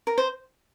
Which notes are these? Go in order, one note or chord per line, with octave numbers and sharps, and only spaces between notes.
A#4
C5